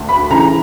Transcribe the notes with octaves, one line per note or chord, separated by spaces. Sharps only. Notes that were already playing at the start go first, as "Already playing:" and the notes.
Already playing: D2
B5
C#3 E3 A#5